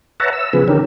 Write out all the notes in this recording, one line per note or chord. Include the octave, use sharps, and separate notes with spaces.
B4 C#5 E5 F#5 A5 A#5
E6
C#3 F3 B3 G#4 B4
D3 D#3 C#4 G4 A#4